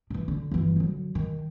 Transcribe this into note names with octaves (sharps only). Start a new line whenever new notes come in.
D#3 E3
D3
G1 E3
D3 F#3
D#3